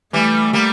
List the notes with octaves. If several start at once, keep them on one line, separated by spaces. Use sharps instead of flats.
E3 G3 A3
G3 A#3